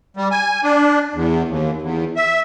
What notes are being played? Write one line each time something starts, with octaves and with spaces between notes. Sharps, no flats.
G3
G#5
D4
E2
D#2
E2
E5